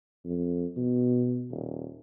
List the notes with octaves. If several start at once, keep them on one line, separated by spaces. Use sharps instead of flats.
F2
B2
D#1